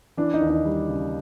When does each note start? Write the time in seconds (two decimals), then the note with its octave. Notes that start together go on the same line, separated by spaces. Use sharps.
0.17 E3 D4
0.34 D#4
0.41 D#2
0.50 D#4
0.65 G3
0.89 C#3